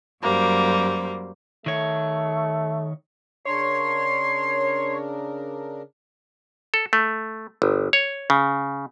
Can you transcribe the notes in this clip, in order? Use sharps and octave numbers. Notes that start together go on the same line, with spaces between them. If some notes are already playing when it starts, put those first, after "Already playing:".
F#2 F#3 G3 A#3 C5
D#3 A3 C#5
C#3 D4 A#4 C#5 C6 C7
A4
A3
G1
C#5
C#3